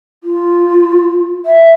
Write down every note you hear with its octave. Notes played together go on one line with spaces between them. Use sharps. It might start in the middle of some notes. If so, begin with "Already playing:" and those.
F4
E5